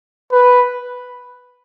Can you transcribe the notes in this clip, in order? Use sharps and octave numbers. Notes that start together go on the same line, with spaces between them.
B4